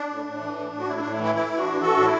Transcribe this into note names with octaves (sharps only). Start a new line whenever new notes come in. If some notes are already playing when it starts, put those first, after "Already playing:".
Already playing: D4
A2
A2
E3
A2
A2
F#4
A2 E4
A2 D4
E4
E3
E4
E3 E4
E3
D4 F#4
E3
E3 F#4 A4
A2 D4
E4